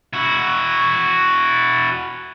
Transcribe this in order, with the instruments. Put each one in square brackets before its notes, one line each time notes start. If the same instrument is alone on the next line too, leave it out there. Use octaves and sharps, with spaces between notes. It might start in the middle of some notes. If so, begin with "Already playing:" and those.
[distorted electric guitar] E4 F#4